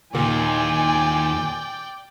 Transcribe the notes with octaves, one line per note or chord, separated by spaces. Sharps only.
D#2 A#2 D5 G5 G#5